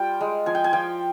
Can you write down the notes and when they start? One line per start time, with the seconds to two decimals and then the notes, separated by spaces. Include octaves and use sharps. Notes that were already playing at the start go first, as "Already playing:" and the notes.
Already playing: G3 F4 G5
0.21 G#3
0.46 F3 G#5
0.55 G5
0.64 G#5
0.73 F3 G5